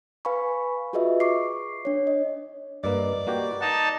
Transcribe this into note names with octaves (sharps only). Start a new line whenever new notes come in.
B4 F5 G#5 B5 C#6
F4 F#4 G#4 B4 D#5 E5
C#6 D6 C7
D4 C#5
D#5
G2 A#3 A#4 B4 D5 D#5
A#3 F#4 G4
D#4 F#5 A5 A#5